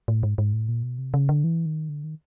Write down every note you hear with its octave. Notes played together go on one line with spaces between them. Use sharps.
A2
G#2
G#2
A2
A#2
B2
C3
C#3
D3
E3
D#3
D3
D#3